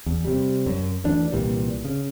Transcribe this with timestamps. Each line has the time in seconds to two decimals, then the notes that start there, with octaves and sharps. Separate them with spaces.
0.06 E2
0.25 C3 G3
0.66 F#2
1.04 D2 E3 D4
1.32 C2 A#2 E3 G3
1.85 C#3